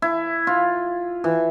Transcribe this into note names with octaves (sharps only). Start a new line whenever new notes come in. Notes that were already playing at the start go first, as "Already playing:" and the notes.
E4
F4
E3